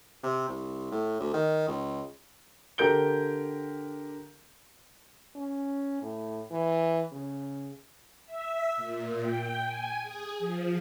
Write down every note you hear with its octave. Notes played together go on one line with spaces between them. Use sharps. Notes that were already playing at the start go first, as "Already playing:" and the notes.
C3
C2
A2
D2
D#3
C#2
D3 G4 A#4 G6 D7 G7
C#4
A2
E3
C#3
E5
A#2
G5
G#5
G#4
F3